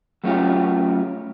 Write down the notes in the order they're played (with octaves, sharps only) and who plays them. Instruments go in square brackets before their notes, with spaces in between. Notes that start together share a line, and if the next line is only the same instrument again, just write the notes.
[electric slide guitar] F#3 A3 C#4 F4 G4